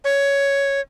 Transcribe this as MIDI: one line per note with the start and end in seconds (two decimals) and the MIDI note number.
0.04 0.80 73